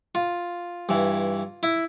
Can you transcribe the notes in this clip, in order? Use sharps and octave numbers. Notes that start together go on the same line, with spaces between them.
F4
G2 E3
E4